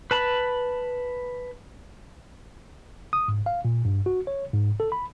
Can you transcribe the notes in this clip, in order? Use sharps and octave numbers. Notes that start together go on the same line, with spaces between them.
B4 A5 B5
D#6
G#2
F5
A#2
G2
F#4
C#5
G#2
A4
B5